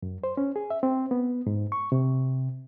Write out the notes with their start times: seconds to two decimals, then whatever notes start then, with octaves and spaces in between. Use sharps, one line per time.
0.03 F#2
0.24 C5
0.37 C#4
0.56 G#4
0.70 E5
0.83 C4
1.11 B3
1.47 G#2
1.72 C#6
1.92 C3